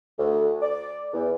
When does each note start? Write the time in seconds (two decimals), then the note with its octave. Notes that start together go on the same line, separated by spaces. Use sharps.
0.17 D2
0.60 D5
1.12 E2